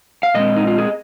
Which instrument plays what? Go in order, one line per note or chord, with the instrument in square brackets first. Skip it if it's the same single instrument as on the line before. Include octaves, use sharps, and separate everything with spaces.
[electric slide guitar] F5
A#2 G#3 C4 D#5
D#4
F4
G#4